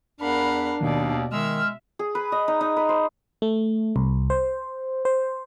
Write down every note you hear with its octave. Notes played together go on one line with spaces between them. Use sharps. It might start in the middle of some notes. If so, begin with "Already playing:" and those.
E2 D4 A#4 F5 F#5 B5
D#2 B2 D#3 D5
D#3 G#3 E5 E6 F6
G#4
B4
D#5
D#4
D#4
B4
C5
A3
C2
C5
C5